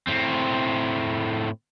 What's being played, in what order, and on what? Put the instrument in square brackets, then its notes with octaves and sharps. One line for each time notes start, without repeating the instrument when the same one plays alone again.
[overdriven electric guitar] A2 C4